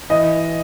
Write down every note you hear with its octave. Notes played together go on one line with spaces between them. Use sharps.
E3 D#5